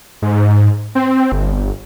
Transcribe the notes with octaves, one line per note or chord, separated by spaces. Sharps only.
G#2
C4
G1